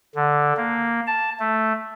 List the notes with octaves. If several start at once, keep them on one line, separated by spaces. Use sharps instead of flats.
D3
A#3
A5
A3